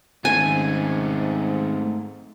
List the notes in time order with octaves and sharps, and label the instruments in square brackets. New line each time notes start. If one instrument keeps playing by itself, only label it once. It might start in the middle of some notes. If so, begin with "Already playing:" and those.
[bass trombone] G#2 [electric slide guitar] D#3 C#4 A5 [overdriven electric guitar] A3 C4 [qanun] G#5